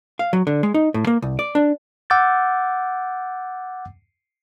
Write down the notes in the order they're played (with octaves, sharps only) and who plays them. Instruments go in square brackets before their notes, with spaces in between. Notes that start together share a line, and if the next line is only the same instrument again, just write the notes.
[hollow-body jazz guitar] F5
F#3
D3
G#3
D#4
A2
A#3
C2
D5
D4
[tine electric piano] F#5 D6 E6 G6 A6